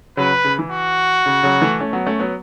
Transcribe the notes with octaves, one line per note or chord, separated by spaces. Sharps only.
C#3 F#3 B4
C#3
E3
F#4
C#3
C#3 F#3
E3 A3
A3 C#4
F#3 B3
A3 C#4
F#3 B3